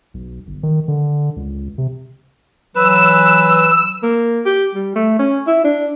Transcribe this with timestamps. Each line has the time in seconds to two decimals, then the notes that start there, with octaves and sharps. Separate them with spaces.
0.14 B1
0.47 G1
0.63 D#3
0.88 D3
1.36 C#2
1.78 C3
2.75 E3 F#3 B4 E6
4.03 A#3
4.46 G4
4.74 G3
4.96 A3
5.19 C#4
5.47 E4
5.64 D4